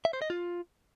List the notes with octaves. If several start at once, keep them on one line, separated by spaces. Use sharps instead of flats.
E5
C5
D#5
F4